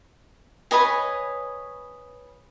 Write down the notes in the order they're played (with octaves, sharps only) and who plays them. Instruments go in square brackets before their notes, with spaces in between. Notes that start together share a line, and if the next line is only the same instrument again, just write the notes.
[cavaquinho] B4 C#5 D#5 G#5